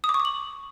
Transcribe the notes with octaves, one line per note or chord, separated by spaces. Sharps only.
D#6
D6
C#6
D6
F#7